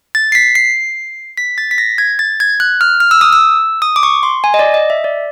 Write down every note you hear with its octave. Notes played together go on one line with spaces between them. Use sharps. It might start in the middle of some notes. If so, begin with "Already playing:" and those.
A6
C7
B6
C7
B6
A6
B6
A#6
G#6
A6
G#6
F#6
F6
F6
E6
D#6
E6
D#6
D6
C#6
C6
G#5
D#5
D5
D#5
E5
D5